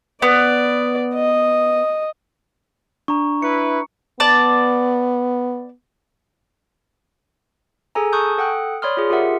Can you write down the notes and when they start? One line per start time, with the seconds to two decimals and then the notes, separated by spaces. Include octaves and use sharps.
0.22 B3 D5
1.14 D#5
3.08 D4 A#5 C#6
3.42 E4 B4 C#7
4.20 B3 D5 A5
7.95 G#4 A4 G#5 A#5
8.13 G#5 A5 C#6 D#6 F#6 G6
8.38 A4 F#5 G5 D#6 F#6
8.82 C#5 D5 B5 C6 D#6 F6
8.97 F4 G#4
9.10 F4 G4 A#4 E5 F#5